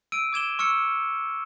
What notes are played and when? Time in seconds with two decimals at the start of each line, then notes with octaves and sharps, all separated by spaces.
0.12 E6 D7 D#7
0.33 D6 G#6 E7 G7
0.59 C#6 E6 F6 C#7 G7